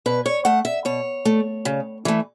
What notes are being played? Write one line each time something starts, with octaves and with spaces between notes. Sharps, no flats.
B2 B4
C#5
A3 F#5
E5
B2 C#5
A3
C#3
E3 A3